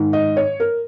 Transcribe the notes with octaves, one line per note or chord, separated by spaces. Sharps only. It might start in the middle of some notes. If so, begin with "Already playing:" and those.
Already playing: G#2 D#3
D#5
C#5
A#4